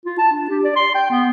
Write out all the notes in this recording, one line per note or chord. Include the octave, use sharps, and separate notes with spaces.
F4
A5
D4
G4
D5
C6
G5
B3